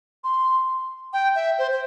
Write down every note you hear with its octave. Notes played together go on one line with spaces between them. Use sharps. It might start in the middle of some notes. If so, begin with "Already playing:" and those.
C6
G5
E5
C5
C5